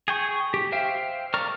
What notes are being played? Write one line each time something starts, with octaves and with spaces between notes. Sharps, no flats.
G#4 G5 C#6
G4
C5 E5 F5 G5
A#4 D5 A#5 C#6 F6